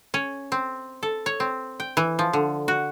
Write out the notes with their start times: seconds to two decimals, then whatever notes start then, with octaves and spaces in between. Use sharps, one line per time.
0.14 C#4
0.52 C4
1.03 A4
1.26 C#5
1.40 C4
1.80 G5
1.97 E3
2.19 F3
2.33 D3
2.68 F#4